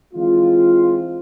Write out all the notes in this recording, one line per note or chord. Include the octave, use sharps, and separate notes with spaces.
E3 G#3 C4 F4